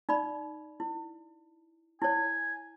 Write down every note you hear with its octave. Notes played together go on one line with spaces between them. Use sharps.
D#4 D5 B5
E4
E4 C#5 G#5